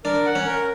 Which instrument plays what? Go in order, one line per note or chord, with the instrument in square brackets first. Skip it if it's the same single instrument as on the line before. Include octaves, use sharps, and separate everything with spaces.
[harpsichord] D4 [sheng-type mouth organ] A#4
[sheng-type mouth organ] F#5
[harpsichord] C#4
[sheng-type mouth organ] A#4